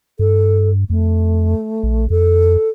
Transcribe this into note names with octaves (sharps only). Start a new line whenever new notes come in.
G2 A4
F2 A3
A#1
F2 A4